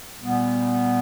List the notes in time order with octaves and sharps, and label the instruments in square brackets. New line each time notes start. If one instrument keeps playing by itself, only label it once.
[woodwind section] A#2 G3 B3